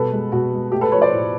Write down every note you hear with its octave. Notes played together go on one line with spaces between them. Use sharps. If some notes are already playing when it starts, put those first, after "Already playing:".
Already playing: B2 G3 A4 B4
G#3
B2 F#4
G#3
A3 G4
A4 B4
F3 B4 C#5
C5 D5
A2